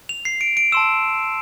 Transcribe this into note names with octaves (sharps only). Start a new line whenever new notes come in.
F7
C7
D7
D7
A5 C6 E6 E7